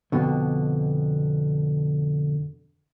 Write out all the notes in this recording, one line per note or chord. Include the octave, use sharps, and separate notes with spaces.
F2 B2 D3